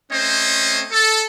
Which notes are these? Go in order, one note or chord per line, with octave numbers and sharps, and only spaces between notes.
A3 C4 C#4 C5 D#5
A4